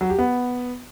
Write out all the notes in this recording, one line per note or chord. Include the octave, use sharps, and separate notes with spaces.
F#3
G4
B3